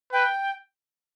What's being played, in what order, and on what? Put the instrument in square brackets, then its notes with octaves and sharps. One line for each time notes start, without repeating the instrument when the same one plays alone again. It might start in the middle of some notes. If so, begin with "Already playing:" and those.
[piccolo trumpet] B4 [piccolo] G5